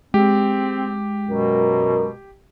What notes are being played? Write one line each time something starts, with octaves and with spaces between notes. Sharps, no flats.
G#3 C4 G4
F#2 B2 A#4